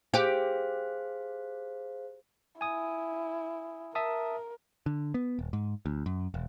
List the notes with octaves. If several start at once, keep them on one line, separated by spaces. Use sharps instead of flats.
G4 G#4 C5 F5
E4 G#5 D#6
A#4 E5 A5 D#6
D3
B3
D#1
G#2
D2
F#2
E1